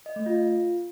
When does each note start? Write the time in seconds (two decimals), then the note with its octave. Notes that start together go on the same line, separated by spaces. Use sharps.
0.06 D#5
0.16 A3
0.26 F4